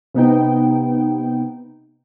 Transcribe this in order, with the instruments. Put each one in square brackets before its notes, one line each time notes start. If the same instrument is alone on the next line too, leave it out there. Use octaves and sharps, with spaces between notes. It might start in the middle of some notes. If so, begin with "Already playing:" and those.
[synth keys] C3 B3 D#4 G5